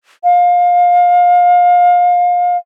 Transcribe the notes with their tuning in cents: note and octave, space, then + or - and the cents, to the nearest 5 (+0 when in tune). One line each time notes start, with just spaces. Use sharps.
F5 +25